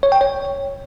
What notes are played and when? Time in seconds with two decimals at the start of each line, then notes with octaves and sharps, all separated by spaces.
0.03 C#5
0.12 G5
0.21 C#5